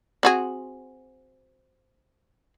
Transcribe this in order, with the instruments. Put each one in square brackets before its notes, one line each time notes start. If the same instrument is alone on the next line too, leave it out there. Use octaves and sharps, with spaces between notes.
[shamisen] C4 F#4 G#4